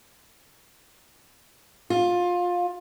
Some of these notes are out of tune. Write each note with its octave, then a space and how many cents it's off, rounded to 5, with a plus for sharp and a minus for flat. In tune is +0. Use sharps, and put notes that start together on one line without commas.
F4 +20